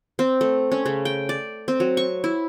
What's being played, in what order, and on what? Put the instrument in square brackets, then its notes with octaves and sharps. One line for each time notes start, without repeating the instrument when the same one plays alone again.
[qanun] C4
A3
C#4
C#3
G5
D5
C4
F#3
C#6
E4